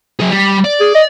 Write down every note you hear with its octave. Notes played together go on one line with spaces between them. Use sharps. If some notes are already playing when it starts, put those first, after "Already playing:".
F#3 G#4
G3
D5
G#4
D#5